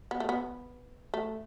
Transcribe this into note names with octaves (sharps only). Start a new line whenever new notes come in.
B3
A3
B3
A3